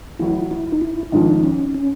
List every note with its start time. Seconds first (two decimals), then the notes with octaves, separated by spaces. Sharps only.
0.19 A1 A2 F#3 E4
0.51 E4
0.72 D#4
0.81 E4
1.12 G#1 G#2 F3 D4
1.43 C#4
1.74 C#4